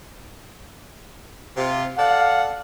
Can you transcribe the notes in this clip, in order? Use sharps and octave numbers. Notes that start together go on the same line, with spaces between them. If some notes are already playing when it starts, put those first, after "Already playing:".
C3 F4
A4 D5 F5 F#5